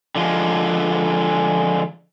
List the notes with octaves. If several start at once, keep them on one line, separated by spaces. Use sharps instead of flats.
D3 F3 G#3